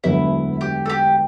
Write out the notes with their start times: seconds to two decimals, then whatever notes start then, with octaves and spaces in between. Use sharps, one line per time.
0.04 E1 D2 D3 F#3 B3 E4
0.61 G4
0.86 A4
0.89 G4